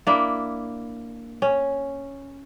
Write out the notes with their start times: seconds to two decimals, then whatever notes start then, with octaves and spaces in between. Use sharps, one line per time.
0.07 A#3 D4 E4
1.42 C#4